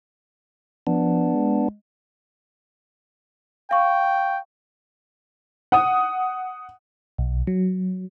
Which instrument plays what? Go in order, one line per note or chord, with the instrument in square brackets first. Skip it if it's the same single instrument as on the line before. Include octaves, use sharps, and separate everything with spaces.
[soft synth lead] F3 [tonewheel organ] B3 D4
[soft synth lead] G#3
[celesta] F5 C#6 [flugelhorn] G5
[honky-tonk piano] F#5 D#6
[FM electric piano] B1
F#3